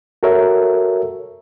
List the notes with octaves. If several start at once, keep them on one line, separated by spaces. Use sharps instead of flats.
F#4 A4 A#4 C#5 E5